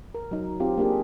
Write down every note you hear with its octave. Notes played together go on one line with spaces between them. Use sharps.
A#4
F#3 D#4
C4 F4 G4
A#3 D4 G4 G#4